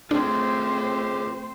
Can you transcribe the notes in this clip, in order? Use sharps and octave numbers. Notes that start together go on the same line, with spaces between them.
A3 C4 D4 F4 G#4 C5